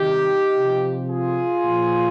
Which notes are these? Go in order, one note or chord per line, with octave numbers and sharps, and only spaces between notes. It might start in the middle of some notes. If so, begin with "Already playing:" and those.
Already playing: C3 D#3 G3 D#4 G4
C3 F3
F4 G#4
A#2 F3